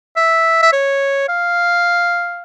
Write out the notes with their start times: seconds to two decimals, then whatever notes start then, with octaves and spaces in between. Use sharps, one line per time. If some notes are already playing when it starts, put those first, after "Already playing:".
0.16 E5
0.63 E5
0.73 C#5
1.29 F5